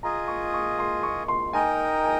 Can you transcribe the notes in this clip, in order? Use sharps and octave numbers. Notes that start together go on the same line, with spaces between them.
F4 G#4 D#5 A#5
C#6
C#6
C6
C#6
C6
D#4 A#4 D#5 G5 G#5
G#5